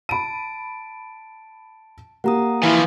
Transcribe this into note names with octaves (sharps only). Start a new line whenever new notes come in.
A5 B5 D7 D#7
A#3 G4 F#5 A#5 D#6
E3 F3 E4 B4 F5